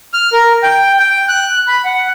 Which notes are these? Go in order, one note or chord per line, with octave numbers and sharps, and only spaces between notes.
F6
A#4
G5
G5
F#6
B5
F#5